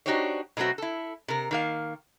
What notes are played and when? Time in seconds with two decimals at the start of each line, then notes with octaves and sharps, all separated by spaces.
0.06 D4 D#4 F#4 G4 C5 C#5
0.57 B2 F#3 A3 C4 F#4
0.78 E4 A4
1.28 C3 A#4
1.51 D#3 A#3 F5